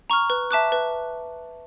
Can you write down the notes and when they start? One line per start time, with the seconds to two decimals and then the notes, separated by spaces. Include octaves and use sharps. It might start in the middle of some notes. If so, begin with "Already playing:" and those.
0.10 A#5 C#6 F6
0.30 B4
0.51 E5 A5 D6 F#6
0.72 B4